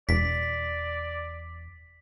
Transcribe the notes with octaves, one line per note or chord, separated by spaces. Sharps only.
E1 D5 B6